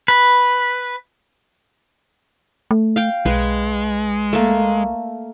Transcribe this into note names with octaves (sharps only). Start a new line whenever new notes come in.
B4
A3
F5 G5
B1 G#3 B4
A3 A#3